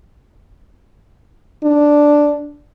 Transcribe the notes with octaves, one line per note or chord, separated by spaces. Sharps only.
D4